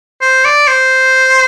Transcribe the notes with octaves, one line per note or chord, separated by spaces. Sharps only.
C5
D5
C5